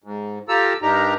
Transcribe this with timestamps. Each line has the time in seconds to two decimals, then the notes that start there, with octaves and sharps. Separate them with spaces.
0.04 G#2
0.49 F4 G4 A4 A#5 E6
0.82 G2 D4 D#4 G4 A#4 A#5